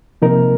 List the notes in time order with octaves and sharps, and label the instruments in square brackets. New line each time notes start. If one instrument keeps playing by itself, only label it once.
[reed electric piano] C3 F3 A#3 D#4 A#4